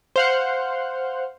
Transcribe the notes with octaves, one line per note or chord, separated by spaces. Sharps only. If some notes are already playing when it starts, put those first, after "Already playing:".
C5 F5 F#5